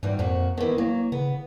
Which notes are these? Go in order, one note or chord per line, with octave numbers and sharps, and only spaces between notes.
E2 G#2 B2 G3
F2 A#2 F3 F#4
D#3 E3 B3
F#3 A#3
C#3 B3